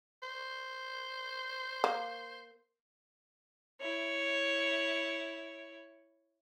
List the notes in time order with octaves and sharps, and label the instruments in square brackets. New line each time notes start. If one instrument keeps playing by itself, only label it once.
[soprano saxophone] C5
[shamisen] A#3
[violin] E4 C#5